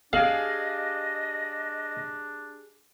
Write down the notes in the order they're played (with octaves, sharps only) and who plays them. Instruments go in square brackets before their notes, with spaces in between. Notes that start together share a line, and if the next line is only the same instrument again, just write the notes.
[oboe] D4 [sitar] G4 G#4 [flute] D#5 [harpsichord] F5